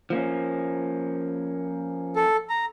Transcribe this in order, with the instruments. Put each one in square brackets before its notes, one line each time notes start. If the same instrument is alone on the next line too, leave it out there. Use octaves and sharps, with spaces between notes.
[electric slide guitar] F3 A#3 C#4
[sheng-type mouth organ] A4
A#5